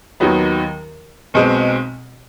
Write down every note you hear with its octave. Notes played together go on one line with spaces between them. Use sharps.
D#2 D#3 F#3 B3
B1 B2 G#3 C4